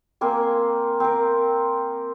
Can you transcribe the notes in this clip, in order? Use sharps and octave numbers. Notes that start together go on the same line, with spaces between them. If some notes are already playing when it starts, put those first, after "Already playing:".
A#3 C4 G#5
C4 A#4